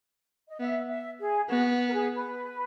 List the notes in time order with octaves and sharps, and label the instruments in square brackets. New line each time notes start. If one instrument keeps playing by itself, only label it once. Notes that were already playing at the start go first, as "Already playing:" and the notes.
[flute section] D#5
[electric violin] B3 [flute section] E5
[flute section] E5
G#4
[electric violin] B3 [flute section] F#4
[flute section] A#4
G#4
B4